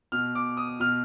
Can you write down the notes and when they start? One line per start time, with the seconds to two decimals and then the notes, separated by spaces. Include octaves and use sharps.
0.12 B2 F6
0.35 D6
0.57 D#6
0.80 B2 F6